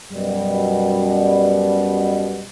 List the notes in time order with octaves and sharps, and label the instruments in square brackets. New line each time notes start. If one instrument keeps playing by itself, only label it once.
[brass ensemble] F#2 B2 G3